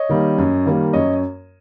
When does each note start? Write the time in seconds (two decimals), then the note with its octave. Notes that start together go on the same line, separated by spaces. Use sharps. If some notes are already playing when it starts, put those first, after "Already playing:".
Already playing: C#5 D#5
0.10 D#3 G3 A#3
0.38 F#2
0.66 D#3 G3 A#3
0.93 F#2 C#5 D#5